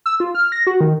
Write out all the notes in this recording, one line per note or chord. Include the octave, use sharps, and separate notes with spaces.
E6
F4
F6
A#6
F#4
D#3